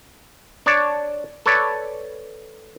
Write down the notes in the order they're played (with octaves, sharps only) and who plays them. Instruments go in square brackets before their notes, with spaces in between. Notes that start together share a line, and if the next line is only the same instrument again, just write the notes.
[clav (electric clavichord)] D4 C#5 D5 A5
A4 B4 C#5 D5